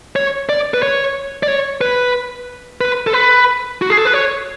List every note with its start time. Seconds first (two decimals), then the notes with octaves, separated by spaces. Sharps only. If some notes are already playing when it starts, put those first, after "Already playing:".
0.16 C#5
0.49 D5
0.74 B4
0.83 C#5
1.43 D5
1.48 C#5
1.81 B4
2.81 B4
3.07 A4
3.13 B4
3.82 F#4
3.90 G#4
3.97 A4
4.05 B4
4.14 C#5